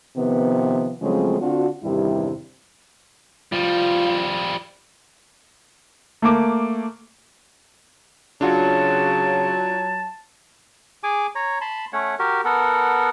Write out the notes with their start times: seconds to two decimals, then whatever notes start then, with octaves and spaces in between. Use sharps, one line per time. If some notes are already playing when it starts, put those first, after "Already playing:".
0.17 C3 D#3 F3 B3
1.02 C#3 F3 F#3 G#3 A3 C4
1.40 D3 C4 D4 F4 F#4
1.84 E2 G2 C3 D#3 G3 E4
3.52 F3 G3 F4
6.22 A3 A#3 D6
8.41 C#3 F#3 D4 F4 F#4 A5
11.03 G#4 G#5 D6
11.35 C#5 A#5
11.61 A5 B5 C6
11.93 A3 C#4 C#5 F#5
12.19 F#4 G4 A#4
12.45 B3 A4 A#4 F#5